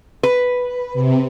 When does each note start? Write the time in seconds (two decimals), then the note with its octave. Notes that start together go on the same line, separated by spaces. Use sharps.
0.23 B4
0.94 C3